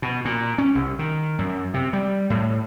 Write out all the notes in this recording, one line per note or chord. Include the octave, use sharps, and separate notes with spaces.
B2
A#2
C#4
C2
D#3
F#2
C3
G3
A2